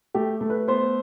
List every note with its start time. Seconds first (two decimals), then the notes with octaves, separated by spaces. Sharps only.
0.14 A3 G4
0.41 A3
0.50 B4
0.68 B3 C5